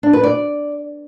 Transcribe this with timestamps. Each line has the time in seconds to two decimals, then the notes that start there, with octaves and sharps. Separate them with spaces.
0.03 D4
0.13 B4
0.24 D5